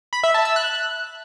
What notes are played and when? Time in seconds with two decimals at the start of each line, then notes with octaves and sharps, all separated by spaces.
0.13 B5
0.23 E5
0.34 A5
0.45 E6
0.56 F#6